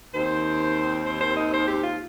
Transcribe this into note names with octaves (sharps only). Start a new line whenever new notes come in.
D#2 D#3 C4 C5
C5
C5
D#5
C5
G4
F4